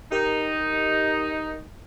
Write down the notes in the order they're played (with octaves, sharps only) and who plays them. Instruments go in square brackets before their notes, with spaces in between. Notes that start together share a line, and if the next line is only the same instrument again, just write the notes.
[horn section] D#4 [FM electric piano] G4 A#4